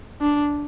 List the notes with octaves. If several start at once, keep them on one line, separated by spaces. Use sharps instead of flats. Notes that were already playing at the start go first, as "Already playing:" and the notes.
D4